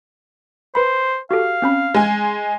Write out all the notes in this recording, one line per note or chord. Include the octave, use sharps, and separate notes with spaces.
B4 C5 B5
F#4 G4 A4 F5
C4 C#4 B5
G#3 G#5